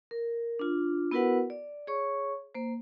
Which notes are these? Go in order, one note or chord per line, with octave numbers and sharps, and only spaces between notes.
A#4
D4 F4
B3 E4 F#4 A#4 B4 F#5
D5
G#4 C#5 C#6
A#3 C5